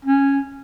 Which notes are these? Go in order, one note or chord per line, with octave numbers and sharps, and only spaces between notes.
C#4